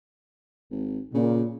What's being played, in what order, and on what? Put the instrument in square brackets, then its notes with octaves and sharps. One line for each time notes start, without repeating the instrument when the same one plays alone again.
[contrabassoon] G#1
[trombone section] A#2 [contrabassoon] C#3